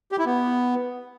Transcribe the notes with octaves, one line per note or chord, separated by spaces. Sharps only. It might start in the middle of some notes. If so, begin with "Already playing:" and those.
G4
E4
B3